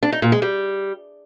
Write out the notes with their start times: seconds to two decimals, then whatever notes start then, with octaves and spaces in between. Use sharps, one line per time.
0.03 D4
0.12 D#4
0.22 A#2
0.32 G#3
0.42 G3